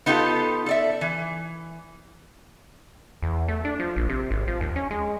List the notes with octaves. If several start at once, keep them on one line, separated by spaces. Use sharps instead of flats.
B3 D#4 F4 G4 A4
A4 D5 E5
E3
E2
A3
D4
F3
A#1
C3
G#1
F3
D#2
C#4
G#3